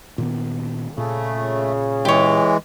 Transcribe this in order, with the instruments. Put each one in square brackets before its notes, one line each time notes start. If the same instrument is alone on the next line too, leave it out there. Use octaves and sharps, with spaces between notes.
[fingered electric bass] A#2 D#3 B3
[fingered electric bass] A#2 [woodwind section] C#3 [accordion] A3
[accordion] E3 G#3 [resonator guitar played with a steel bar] G4 C#5